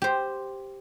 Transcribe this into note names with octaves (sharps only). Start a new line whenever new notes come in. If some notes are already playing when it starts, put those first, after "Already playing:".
G4 C5